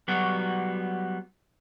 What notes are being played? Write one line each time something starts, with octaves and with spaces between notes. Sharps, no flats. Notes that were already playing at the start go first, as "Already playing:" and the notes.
F#3 G3 B3 F#4